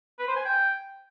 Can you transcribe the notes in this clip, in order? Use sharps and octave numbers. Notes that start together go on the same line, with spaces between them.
B4
C5
G#5
G5